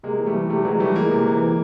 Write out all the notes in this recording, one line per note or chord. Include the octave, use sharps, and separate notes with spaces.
C3 G#3 A#3
E3
G3 A3
E3
C3 G3 A3
E3 F#3 G#3
E3 G3 A3
E3 G#3 A#3
C3
E3
E3